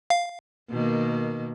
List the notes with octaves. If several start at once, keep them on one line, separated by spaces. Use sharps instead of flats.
F5
B2 D#3 A#3